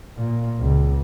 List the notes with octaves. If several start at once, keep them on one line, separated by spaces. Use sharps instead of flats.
A#2
C#2